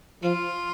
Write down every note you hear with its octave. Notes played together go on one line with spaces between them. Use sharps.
F3 F4